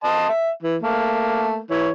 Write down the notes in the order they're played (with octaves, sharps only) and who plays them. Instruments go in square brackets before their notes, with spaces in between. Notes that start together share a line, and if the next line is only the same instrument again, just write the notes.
[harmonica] D#5 A5 C6
E5
E3
A3 A#3
E3 C#5